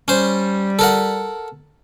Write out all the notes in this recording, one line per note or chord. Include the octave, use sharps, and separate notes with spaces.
G3 C#4 C5
A4 A#4 F#5